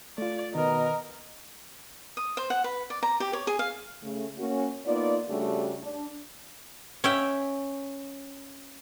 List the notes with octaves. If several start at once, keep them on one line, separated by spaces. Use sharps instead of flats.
A3 F4 D5
B2 D#3 A#4 D#5
D#6
C5
F#5
B4
D5
A#5
G4
C#5
G#4
F5
C#3 A3
A#3 C#4 F#4
A#3 B3 D#4 F4 D5
C#3 G3 A3 D4 F#4 G4
D4
C#4 E5 G5